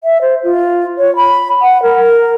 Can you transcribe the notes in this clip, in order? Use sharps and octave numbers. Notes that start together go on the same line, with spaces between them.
E5
C5
F4
C#5
B5
F#5
A#4